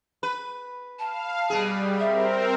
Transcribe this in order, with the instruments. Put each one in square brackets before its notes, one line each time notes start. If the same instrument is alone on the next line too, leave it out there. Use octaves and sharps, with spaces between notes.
[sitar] B4
[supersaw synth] F5 [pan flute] A5
[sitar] B2 G#4 [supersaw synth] G3
[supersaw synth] C4 A#4 [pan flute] E5